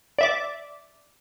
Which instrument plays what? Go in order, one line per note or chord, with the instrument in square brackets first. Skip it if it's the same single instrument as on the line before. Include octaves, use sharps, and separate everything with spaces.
[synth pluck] D5 E5 D6